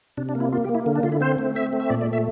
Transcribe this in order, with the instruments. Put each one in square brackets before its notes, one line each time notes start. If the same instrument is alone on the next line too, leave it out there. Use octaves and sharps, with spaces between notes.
[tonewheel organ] C3 D4
D4
A#3
E4
A#3 F4
G4
A#3
E4
D3
D4
D3 F4
E4
C4 C5
A3
C4 E5
A3
E5
A#2 D5
D5
A3
E5